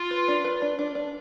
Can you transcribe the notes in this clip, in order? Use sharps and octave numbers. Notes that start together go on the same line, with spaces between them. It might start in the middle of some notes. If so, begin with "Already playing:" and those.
Already playing: F4
B4
D4
B4
D4
D4
D4